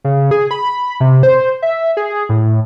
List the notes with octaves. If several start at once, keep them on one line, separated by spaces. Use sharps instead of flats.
C#3
G#4
B5
C3
C5
E5
G#4
A2